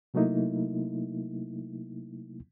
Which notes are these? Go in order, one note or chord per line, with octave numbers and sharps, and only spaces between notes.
C3 F#3 A3 A#3 D#4 E4